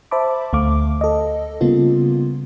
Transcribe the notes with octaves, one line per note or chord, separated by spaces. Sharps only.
C5 E5 A5 B5 D6
D2 A3 F5 D6
A4 D#5
C#3 G3 A#3 B3 F4